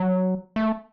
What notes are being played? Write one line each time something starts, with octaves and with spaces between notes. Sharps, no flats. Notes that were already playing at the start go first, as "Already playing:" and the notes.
Already playing: F#3
A3